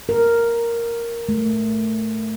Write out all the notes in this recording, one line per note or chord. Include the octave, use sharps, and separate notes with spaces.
A#4
A3